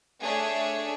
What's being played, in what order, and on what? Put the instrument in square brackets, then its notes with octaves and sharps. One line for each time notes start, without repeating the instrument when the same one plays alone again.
[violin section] A3 D4 G#4 C#5 E5